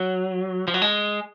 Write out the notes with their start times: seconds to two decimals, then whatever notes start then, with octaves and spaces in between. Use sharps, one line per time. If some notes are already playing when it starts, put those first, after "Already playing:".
Already playing: F#3
0.68 F3
0.74 F#3
0.82 G#3